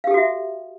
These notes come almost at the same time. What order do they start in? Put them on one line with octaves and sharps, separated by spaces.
F5 G4 A4 F#4 E5